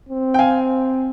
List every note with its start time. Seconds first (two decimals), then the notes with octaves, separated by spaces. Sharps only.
0.09 C4
0.34 G5
0.39 F5 G#5